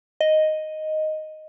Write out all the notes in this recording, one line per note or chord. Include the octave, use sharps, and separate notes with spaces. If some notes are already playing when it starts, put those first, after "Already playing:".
D#5